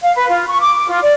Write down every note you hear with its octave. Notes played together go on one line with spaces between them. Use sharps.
F5
B4
F4
C#6
D6
D6
F4
D5